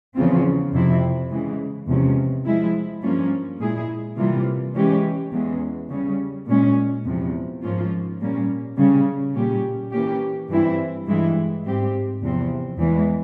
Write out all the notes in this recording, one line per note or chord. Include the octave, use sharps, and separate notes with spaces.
E2 C#3 F3 C4 F4
F2 C3 F3 C4 E4
C#3 E3 G#3
E2 C3 F3 G#3 C#4
F3 G#3 E4
G2 F3 A#3 C#4 F4
A#2 G#3 E4 G#4
C3 E3 G3 A#3 F4
E3 G#3 C#4 G4
E2 E3 G#3 C#4
C#3 G3 C#4
A#2 G#3 C#4
E2 C3 F3
G#2 F3 A#3 C#4 F4
A#2 G3 A#3 C#4
C#3 G3 C#4
A#2 G3 C#4 G4
E3 A#3 C#4 G4
G2 E3 G3 C4 E4
G2 E3 G#3 E4
G#2 G3 C4 G4
E2 C3 F3 C4
E2 E3 G#3